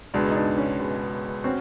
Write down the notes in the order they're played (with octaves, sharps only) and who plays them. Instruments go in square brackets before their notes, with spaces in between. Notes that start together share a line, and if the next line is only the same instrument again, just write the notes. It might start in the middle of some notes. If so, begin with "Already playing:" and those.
[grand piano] C#2 B2 G#3 B3 [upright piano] D4
[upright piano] D#4
D4
C#4
[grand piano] C#2 B2 G#3 B3
[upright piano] C4 [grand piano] C#4 F#4